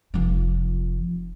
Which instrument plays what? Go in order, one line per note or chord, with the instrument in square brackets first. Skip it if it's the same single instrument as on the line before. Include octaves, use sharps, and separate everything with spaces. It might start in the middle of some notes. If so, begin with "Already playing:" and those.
[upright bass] F1 F3